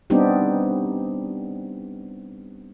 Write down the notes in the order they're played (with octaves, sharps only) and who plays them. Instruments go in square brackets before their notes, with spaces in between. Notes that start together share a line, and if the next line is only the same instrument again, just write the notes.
[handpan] G3 B3 C4 D4 D#4 G4